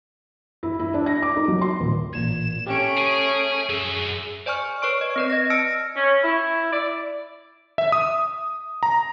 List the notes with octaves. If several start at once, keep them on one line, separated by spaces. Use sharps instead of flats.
E4
E4
D4
A#6
D6
D#4
F#3
C6
D#1
A1 A#2 G#6 E7
A3 C#4 G4 D7
G#4 C#6
F#2 G#4 E5
C5 D5 G#5 C#6 F6
B4 C#5 C#6 D7
D#5
C4 B4 D5
D#5 A#6
A5 E6 F6 A#6 C#7 D7
C#4
E4
D5
E5
D#6
A#5